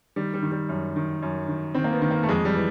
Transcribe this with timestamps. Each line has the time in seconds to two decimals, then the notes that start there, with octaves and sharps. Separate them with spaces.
0.16 D#3 G3
0.34 G3
0.42 D#3
0.52 G3
0.69 F#2
0.96 D#3
1.22 F#2
1.48 D#3
1.75 D#3 C4
1.84 A#3
1.92 B3
2.02 D#3
2.11 A#3
2.23 A3
2.29 F2 G#3
2.45 G3
2.55 E3